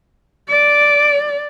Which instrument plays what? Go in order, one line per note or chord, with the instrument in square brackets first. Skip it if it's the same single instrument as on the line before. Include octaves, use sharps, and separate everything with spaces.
[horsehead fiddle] D5 [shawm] D6